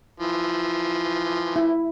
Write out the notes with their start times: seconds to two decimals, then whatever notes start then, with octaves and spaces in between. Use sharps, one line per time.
0.20 E3 F3
1.56 E4